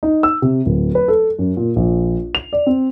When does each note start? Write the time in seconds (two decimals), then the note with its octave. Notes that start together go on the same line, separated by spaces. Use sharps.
0.03 D#4
0.23 E6
0.42 C3
0.66 D1
0.95 B4
1.08 A4
1.39 F#2
1.57 A#2
1.76 A#1
2.35 F7
2.53 D5
2.67 C4